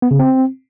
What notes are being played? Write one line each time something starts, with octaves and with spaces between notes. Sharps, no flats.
B3
C#3
C4